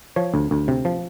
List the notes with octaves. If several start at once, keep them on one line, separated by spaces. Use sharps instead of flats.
F3 C#5
D2
D2
C3
F3